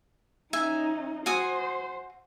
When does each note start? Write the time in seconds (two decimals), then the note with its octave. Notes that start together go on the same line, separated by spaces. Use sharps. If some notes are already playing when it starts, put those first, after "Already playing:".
0.53 C#4 D#4 E5 G#5
1.26 F#4 C5 G#5 D#6